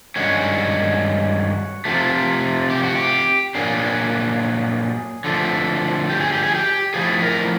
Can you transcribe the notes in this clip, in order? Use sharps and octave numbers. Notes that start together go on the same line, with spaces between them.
G2 D#3 G#3 C#4 F#4
C3 F3 A3
G4
F#4
G4
A#2 F#3 A#3 D4 G#4
D3 F3 A3
G4
G#4
G4
G#4
G4
A2 F3 A3 G#4
A#4